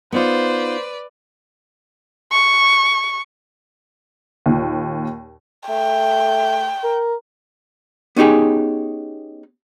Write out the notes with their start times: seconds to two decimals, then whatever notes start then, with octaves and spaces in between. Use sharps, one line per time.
0.12 B3 D#4 F4 B4 C5 D5
2.32 C#6
4.46 D#2 A#2
5.69 A3 G5
6.83 A#4
8.16 B3 C#4 D#4 G4 G#4